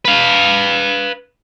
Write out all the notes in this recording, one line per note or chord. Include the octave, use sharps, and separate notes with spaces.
B4 F5